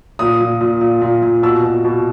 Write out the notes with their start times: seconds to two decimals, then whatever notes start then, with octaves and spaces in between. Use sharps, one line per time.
0.19 A#2 D#6
0.40 A#2
0.61 A#2
0.81 A#2
1.02 A#2
1.23 A#2
1.43 B2 E6
1.64 B2
1.85 B2